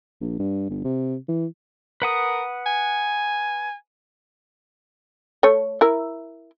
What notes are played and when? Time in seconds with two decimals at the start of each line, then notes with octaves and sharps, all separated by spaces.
0.21 A#1
0.39 G2
0.70 G1
0.84 C3
1.28 E3
2.02 A#4 B4 F#5 D#6
2.66 G#5
5.43 A3 C#5
5.81 E4 A#4